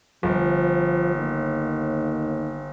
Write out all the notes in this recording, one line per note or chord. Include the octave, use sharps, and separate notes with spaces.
G1 F3
D#2